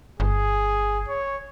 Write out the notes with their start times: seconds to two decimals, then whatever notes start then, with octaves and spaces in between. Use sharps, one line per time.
0.20 G1 G#4
1.08 C#5